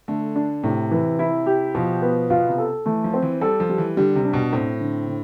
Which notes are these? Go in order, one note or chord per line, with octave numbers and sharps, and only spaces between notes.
D3 A3
D4
A2 C3
E3
E4
G4
B2 F3
B3
B2 F4
C3
A4
E3 A3
F3
C4
E3
G3 A4
F3
G3
E3
D3 G3
C3
D4
B2
A2 C4
D3
D3